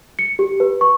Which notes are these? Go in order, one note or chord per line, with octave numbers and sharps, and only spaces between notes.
C#7
G4
B4
C#6